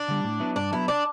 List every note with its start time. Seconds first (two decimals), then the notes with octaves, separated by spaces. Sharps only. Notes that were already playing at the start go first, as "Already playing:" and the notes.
Already playing: D4
0.08 D3 G3
0.24 A2
0.40 F#3 B3 E4
0.56 G2 D4
0.72 F#3 B3 E4
0.88 D4